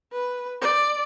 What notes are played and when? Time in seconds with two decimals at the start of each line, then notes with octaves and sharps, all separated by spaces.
0.12 B4
0.61 D5